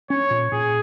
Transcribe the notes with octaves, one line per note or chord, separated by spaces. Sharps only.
C#4 C#5
A#2
A#2 G#4